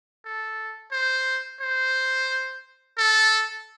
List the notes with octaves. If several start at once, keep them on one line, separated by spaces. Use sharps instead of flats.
A4
C5
C5
A4